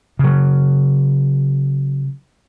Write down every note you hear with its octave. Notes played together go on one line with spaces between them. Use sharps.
C#3 F#3